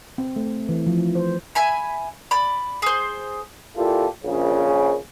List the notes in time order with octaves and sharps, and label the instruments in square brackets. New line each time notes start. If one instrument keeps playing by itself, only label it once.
[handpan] C4
A3
E3
F3
C5
[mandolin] E5 G#5 B5
D5 B5
G#4 C5
[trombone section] A#2 E4 F4 G4 A4
A#1 C#3